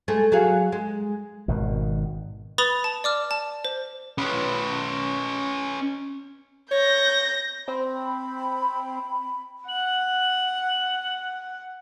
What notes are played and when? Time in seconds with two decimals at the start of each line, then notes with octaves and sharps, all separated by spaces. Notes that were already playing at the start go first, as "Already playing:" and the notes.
0.08 G#3 A3
0.32 F#3 G#4 F5
0.72 G#3
1.48 G#1 B2 D#3
2.58 B4 B5 D#6 A6 F7 G7
2.84 A5
3.04 D5 D6 F6
3.31 A5
3.65 C5
4.18 C#4 B4
6.71 C#5 G6 A#6
7.68 C4 B5
9.69 F#5 F#7